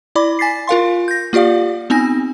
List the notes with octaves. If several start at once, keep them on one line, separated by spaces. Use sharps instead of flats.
E4 D5 B5 D6
G#5 A6 B6 C7
F4 A#4 F5 C6
G6 A#6
A#3 F4 G4 D5 F5
B3 C4 D#4 G#5 A#6